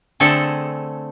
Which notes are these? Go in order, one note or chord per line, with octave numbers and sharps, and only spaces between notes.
D3 A3 C4 G#4 A4